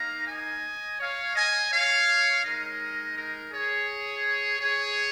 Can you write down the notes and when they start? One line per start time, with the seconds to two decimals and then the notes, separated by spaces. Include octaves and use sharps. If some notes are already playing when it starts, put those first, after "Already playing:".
Already playing: A#3 D#4 F5 A#5
0.28 D#5 G#5
1.00 C#5 F5
1.36 D#5 G#5
1.72 C#5 F5
2.44 G#3 D#4 A#4 D#5
3.16 A#4
3.52 G#4 C#5
4.59 G#4 C#5